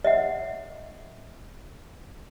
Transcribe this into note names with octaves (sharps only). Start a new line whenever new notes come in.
D#5 E5 F#5